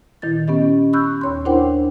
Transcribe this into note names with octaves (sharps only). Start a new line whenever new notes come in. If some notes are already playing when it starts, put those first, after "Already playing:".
A#2 D#3 E4 A6
B3 C#4 G4 D#5
B5 C#6 E6 F#6 G6
D#2 C#5 C6
D4 E4 A#4 C5 F#5 G5